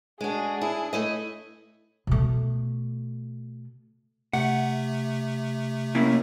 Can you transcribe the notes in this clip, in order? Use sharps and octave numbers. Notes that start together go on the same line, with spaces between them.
G#3 D4 F#4 G#4
E4
A3 E4 D#5
B2 A3
C3 A3 F#5
A#3 C#4 E4